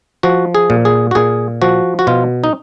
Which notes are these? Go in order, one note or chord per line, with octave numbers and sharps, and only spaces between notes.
F3 F#4
G#4
A#2
G#4
F#4
A#2 G#4
F3 F#4
F#4
B2 F4
D#4